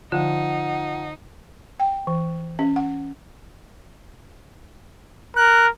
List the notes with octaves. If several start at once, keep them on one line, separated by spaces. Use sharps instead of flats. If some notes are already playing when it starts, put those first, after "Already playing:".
D3 F3 D#4 F#5
G5
E3
C#4
F#5
A#4 F#6